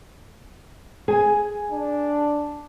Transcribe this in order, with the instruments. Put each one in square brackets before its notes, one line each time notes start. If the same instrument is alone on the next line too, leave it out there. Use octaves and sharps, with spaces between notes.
[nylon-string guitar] G#4 G#5
[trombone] D4